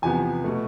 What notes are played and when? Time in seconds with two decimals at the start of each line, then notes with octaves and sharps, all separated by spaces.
0.02 E2 C3 F3 B3 G#5
0.44 B2 A3